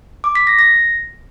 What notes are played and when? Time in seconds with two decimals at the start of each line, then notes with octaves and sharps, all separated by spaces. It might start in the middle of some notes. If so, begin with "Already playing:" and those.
0.24 D6
0.35 B6
0.47 A#6
0.59 A#6